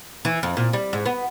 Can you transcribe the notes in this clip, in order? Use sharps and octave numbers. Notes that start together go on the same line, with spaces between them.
E3
F2
A#2
G3
G#2
B3